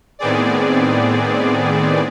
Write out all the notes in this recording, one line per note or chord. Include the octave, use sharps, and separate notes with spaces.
A2 D#3 B3 C4 G#4 D5